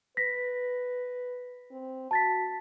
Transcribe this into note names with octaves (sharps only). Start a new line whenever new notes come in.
B4 A#6 B6
C4
F#4 A5 A6 B6